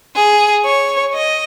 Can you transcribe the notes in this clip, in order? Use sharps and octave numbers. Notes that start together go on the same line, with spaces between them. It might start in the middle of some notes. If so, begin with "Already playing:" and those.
G#4
C#5
D#5